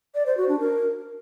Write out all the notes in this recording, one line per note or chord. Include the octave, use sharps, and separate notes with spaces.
D5
C5
F#4
D4
A#4